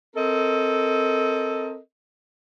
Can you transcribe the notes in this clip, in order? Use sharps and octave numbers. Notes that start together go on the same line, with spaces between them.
C4 A4 A#4 D#5